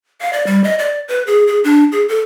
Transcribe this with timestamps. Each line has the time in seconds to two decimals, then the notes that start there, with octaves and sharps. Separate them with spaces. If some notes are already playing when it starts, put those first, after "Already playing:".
0.21 F5
0.33 D5
0.47 G3
0.64 D#5
0.79 D5
1.08 B4
1.27 G#4
1.47 G#4
1.64 D4
1.92 G#4
2.09 A4